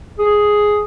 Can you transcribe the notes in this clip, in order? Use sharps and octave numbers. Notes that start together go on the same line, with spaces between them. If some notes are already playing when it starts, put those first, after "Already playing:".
G#4